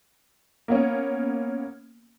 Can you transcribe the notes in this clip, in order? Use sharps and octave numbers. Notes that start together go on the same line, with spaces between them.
A#3 B3 C#4